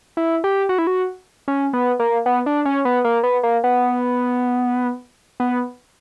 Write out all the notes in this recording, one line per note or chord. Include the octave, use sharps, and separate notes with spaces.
E4
G4
F#4
E4
F#4
C#4
B3
A#3
B3
D4
C#4
B3
A#3
B3
A#3
B3
B3